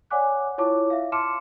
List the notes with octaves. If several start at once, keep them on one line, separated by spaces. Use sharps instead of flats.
C#5 D5 F#5 G#5 D6 F#6
E4 F4 C#5 A5 C#6 D6
E5 F5
A5 C6 D6 F6 C#7 E7